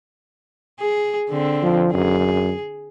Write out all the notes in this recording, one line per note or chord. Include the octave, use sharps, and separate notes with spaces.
G#4
D3 C4
F3
F#2 G#4